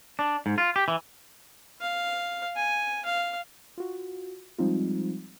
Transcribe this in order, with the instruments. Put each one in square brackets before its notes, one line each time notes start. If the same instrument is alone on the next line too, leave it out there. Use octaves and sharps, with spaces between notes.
[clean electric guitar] D4
G#2
F4
G4
E3
[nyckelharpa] F5
G#5
F5
[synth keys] F4 F#4
F3 G3 G#3 C4 D#4 F4